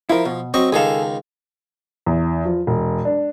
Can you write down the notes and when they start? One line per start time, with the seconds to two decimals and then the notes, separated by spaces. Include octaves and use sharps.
0.10 F3 E4 A#4
0.25 B2
0.54 F#3 C4 D#5 C#6
0.72 C#2 D#3 G#4 A4 F5
2.06 E2
2.45 F3
2.67 E1
3.05 D4